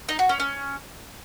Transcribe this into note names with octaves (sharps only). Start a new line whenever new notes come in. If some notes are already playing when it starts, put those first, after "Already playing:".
D#4
F#4
C#4
C#4